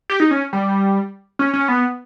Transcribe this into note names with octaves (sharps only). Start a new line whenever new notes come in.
G4
D#4
C#4
G3
C#4
C#4
B3